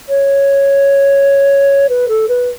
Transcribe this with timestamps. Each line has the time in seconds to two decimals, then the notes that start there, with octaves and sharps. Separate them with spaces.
0.08 C#5
1.89 B4
2.08 A4
2.28 B4